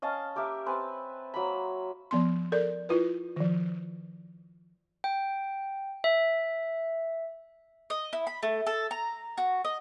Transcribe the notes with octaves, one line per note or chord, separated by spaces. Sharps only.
C#4 D#5 F5 A5
A#3 G4 A#4 E5
C4 B4 G#5 A5
F#3 A#3 B5
F3 B3 C6
A4 A#4 D5
E4 F4 B4
D#3 F3
G5
E5
D#5
E4
B5
A3
A4
A#5
F#4
D#5